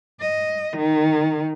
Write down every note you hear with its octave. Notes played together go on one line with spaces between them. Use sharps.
D#5
D#3